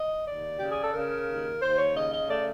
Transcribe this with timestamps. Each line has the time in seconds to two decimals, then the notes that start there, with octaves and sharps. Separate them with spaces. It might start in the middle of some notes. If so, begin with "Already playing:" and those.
Already playing: D#5
0.26 D#2 D5
0.59 C#3 G4
0.72 G#4
0.83 A4
0.94 C#3 A#4
1.28 D#2
1.61 D#2 C5
1.78 C#5
1.95 C#3 D#5
2.12 D#5
2.29 A3 D5